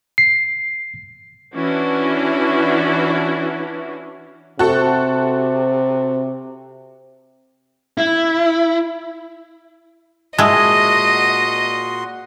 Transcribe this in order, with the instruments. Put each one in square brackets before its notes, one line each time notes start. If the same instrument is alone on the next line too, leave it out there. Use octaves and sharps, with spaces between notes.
[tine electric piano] C7
[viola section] E3 C#4 D4 E4 F#4
[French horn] C3 [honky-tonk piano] F#4 A4
[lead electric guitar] E4
[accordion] A#2 F#4 C6 [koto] G#3 E4 [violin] D#5 [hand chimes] A5 D#6